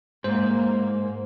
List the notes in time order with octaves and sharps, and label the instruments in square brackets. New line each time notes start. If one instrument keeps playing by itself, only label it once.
[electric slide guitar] G#2 [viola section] A#3 [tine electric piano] C5